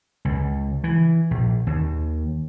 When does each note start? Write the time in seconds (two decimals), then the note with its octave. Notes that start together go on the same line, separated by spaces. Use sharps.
0.25 C#2
0.84 E3
1.31 A#1
1.67 D#2